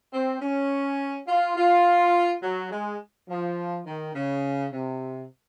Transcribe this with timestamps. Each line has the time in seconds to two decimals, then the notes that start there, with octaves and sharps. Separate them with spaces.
0.13 C4
0.42 C#4
1.28 F4
1.57 F4
2.43 F#3
2.71 G#3
3.30 F3
3.86 D#3
4.15 C#3
4.73 C3